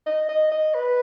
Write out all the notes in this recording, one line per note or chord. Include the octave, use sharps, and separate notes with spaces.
D#5
D#5
D#5
B4